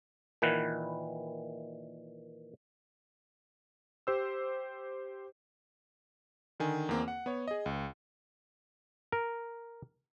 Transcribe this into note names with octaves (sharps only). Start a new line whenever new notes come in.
A#2 D#3 E3 B4 F#5
G4 C5 E6
D3 D#3 G#5
E2 A#3 C4
F#5
B3 C#5
G#4 D#5
C#2
A#4